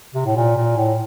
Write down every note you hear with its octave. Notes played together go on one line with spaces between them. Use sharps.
C3
A2
A#2
A#2
A2